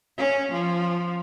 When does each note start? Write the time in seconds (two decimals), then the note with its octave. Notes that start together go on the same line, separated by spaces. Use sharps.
0.17 C#4
0.51 F3